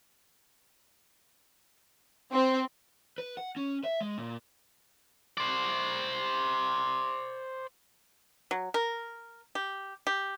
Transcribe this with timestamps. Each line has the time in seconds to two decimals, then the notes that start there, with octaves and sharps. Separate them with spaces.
2.33 C4
3.18 B4
3.37 F#5
3.56 C#4
3.84 E5
4.01 G#3
4.18 A#2
5.38 C5 D5
8.51 F#3
8.74 A#4
9.55 G4
10.07 G4